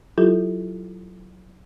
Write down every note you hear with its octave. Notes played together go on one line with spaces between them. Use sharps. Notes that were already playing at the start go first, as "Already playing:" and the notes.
F#3 E4 F4 G4 A4